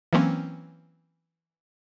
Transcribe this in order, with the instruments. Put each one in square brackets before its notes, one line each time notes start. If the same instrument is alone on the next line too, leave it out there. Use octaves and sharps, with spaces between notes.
[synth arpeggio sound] E3 F#3 A#3 C4 C#4